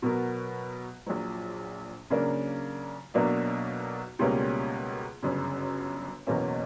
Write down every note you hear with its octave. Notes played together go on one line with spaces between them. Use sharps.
B2 F#3 B3 F#4 A#4
A#1 A#2 F#3
C#3 F#3 A#3 D4 A#4
B1 B2 F#3 A#3 D4
C#2 B2 G3 A#3 C#4
G1 F#2 C#3
F#1 E2 B2 A#3 C#4